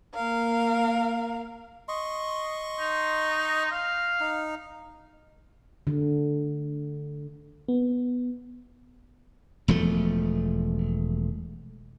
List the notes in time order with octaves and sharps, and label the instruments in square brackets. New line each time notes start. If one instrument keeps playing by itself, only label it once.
[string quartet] A#3 A#4 F5
[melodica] D#5 C6 C#6
[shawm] D#4
F5
[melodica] D#4
[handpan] D3
[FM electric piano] B3
[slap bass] E1 F3 A3